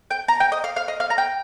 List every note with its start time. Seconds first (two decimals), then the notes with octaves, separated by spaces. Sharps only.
0.11 G5
0.28 A#5
0.40 G5
0.52 D#5
0.64 F5
0.76 F5
0.88 D#5
1.00 F5
1.10 A#5
1.18 G5